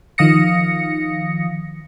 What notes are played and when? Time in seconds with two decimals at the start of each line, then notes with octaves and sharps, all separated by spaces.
0.18 D#3 F3 F5 D#6 A#6 C#7